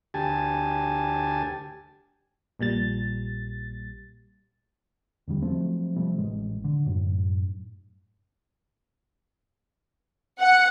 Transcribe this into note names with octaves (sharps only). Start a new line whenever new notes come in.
D2 G4 G#5 A5
A#1 A#2 G3 A6
E2 D3 G3
F3 F#3 A3 C4
C3 F3 G3 A3
A1 G#3
D3
F#2 A2
F#5